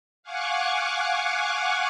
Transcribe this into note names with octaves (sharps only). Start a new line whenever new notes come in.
F5 F#5 G#5 C#6 D6 F#6